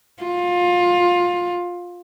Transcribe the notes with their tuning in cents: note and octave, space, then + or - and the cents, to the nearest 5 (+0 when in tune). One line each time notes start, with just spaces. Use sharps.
F4 +20